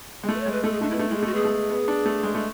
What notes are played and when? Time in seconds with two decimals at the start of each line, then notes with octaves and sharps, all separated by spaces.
0.24 G#3
0.29 A3
0.35 B4
0.40 C#5
0.46 G#3
0.52 B4
0.64 A3 A4
0.73 G#4
0.82 A3 D4
0.90 B3 E4
0.99 A3 D4
1.09 G#3 E4
1.17 G#4
1.23 A3 F#4
1.33 B3 G#4
1.45 A3
1.70 B3
1.88 D4
2.06 A3
2.23 G#3
2.35 A3